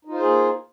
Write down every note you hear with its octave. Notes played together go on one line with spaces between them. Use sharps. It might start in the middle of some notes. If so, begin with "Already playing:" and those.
A#3 D#4 F4 G#4 C5